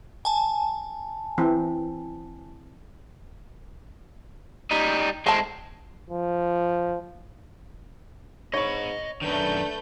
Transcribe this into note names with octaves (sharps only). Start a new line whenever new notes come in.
G#5 A5
E3 C4
G3 D#4
G#3 A3 C4 A5
F3
G#2 C#5 D#5 B5 C#6
F#2 D#3 A3 D4 B4 G6